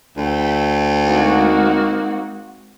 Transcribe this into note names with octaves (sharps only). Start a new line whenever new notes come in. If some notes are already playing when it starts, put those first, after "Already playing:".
D2 E5 G5
G#3 A#3 C4 D#4 F#4